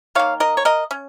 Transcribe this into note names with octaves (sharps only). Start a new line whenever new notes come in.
D#3 A#3 C#5 F5
A#4 D#5
C#5
A#4 D#5
C#4